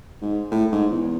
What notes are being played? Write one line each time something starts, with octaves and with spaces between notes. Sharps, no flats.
G#2
A2
G#2
E2